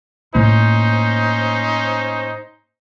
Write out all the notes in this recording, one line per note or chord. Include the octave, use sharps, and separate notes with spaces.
A2 A#3 C#4 D#4 C5